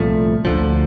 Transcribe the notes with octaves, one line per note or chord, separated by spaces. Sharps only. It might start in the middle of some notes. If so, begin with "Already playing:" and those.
Already playing: C2 A#2 F3 A3
D2 D3 F3